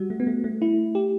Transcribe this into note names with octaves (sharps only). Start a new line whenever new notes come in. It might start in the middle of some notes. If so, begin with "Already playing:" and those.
Already playing: G3 F#4
A3
B3
A3
A3
E4
G4